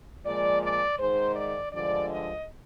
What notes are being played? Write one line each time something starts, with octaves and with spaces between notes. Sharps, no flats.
A#2 F3 G#3 D5
D5
G#2 D#3 G#3 C5
D5
G2 D3 F3 G#3 D5
D#5